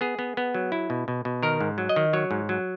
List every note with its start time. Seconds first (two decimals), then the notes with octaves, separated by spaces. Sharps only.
0.01 B3 G#4
0.19 B3
0.37 B3
0.54 F#3
0.72 E4
0.90 B2
1.08 B2
1.25 B2
1.43 D#3 A#4
1.61 G#2
1.78 F#3
1.89 D#5
1.96 D#3
2.13 F#3 C#5
2.31 G#2
2.49 F#3